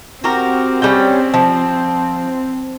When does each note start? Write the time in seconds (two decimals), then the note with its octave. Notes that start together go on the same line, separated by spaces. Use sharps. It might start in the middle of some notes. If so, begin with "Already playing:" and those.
0.24 C4 F#4 G4 A#4
0.82 G3 C#4 G5
1.34 F3